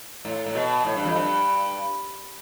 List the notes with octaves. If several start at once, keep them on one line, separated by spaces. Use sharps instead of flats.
A2
A2
B2
A2
G2
F2
G2